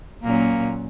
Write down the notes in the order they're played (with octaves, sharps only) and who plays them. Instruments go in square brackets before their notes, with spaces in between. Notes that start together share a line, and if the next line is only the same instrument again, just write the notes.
[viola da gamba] A#2 F#3 C#4 [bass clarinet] A#3